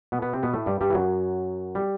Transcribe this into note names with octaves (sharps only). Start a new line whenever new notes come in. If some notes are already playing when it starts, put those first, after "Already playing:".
B2 B3
B2 B3
C3 C4
B2 B3
A2 A3
G2 G3
G2 G3
E3
F#2 F#3
G3